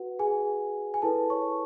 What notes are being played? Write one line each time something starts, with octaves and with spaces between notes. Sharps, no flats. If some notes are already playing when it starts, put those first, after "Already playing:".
Already playing: F#4 B4 F#5
G#4 G#5
G#5
E4 A4 B4 A5
C#5 C#6